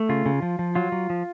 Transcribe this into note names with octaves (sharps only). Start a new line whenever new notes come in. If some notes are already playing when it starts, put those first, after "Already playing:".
Already playing: A3
C#3 F4
C#3
F3
F3
F#3 F4
F#3
F3